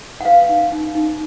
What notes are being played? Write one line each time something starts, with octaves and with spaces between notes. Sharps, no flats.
F#5
B4 F5
D#4
D#4
D#4